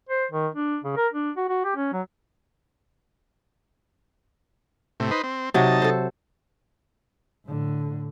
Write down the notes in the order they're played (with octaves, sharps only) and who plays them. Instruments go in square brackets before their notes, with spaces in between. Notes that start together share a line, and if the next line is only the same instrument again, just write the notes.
[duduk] C5
D#3
D4
C#3
A#4
D4
F#4
F#4
G4
C#4
F#3
[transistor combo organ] A2 C3
D#4 B4 C5
C4
[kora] C3 F#3 [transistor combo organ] D#4 A5
[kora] A4 C5
[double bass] A2 D3